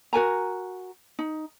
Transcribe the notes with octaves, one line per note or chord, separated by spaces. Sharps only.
F#4 A#4 G#5 A#5
D#4